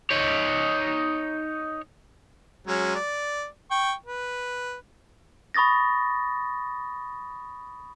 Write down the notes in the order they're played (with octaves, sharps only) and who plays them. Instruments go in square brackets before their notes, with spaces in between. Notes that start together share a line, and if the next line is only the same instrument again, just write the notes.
[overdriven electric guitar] D#4 C#5
[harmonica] F#3 G#3 C#4
D5
G5 C#6
B4
[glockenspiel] B5 C#6 D#6 A6 A#6